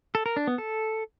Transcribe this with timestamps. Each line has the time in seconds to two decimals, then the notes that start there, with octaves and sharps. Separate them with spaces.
0.15 A4
0.26 A#4
0.37 D4
0.47 B3
0.58 A4